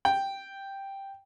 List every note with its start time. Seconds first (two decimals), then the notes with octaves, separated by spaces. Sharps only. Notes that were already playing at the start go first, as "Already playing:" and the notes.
0.05 G5